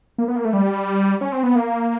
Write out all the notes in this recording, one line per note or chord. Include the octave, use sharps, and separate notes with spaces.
A#3
B3
A#3
A3
G3
C#4
C4
B3
A#3